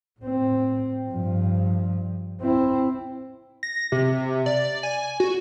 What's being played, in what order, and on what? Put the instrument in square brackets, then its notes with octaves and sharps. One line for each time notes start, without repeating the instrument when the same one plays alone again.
[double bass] A2 C4
G2 F3
C4 E4
[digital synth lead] A#6
C3
D5
G#5
F#4